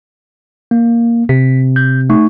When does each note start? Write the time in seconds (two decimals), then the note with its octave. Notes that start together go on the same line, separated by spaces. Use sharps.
0.71 A#3
1.29 C3 B6
1.76 G6
2.10 A3 D#4 C#6